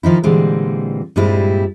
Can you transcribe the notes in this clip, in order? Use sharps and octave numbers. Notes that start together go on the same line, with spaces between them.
D#3 F3 D#4 E4
A#2 D3 E3 G3 G#3 C4
G2 A#2 G3 G#3 C4 E4